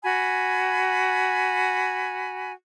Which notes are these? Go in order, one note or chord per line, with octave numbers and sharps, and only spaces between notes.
F#4 G#5 B5